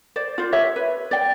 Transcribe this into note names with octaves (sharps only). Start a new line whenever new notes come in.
C5 D5
F4 C5
G4 C#5 E5
B4
D5 G5